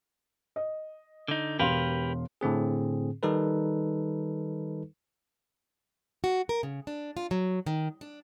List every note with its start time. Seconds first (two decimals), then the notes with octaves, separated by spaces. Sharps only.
0.56 D#5
1.28 D3 D#4
1.59 E1 G4 A#4 B4 F5 C6
2.41 A2 D3 C4 G#4
3.23 D#3 G3 D#4 A4 B4
6.24 F#4
6.49 A#4
6.63 C#3
6.87 D4
7.17 F4
7.31 F#3
7.66 D#3
8.01 D4